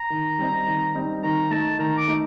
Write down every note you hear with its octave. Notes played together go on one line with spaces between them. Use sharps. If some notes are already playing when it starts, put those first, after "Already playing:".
Already playing: A#5
D#3
G3 C4 D#4
D#3
G3 C4 D#4
D#3 A#5
A3 D#4 A5
D#3 A#5
D6
A3 D#4